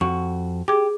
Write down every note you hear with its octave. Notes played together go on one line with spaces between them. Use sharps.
F2 F#4 C#6
G4 G#4 D6